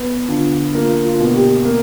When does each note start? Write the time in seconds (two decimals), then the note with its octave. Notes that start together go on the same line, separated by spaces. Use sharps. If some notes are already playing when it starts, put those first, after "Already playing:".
Already playing: B3
0.29 D3 F4
0.74 A#3 F4
1.05 F4
1.20 B2
1.35 G4
1.65 A#3